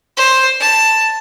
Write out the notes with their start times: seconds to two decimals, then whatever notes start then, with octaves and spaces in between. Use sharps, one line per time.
0.17 C5
0.61 A5